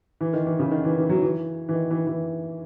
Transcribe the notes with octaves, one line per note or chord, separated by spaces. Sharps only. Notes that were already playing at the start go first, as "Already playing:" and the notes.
E3
D#3
E3
C#3
D#3
E3
E3
F#3
E3
E3
D#3
E3
E3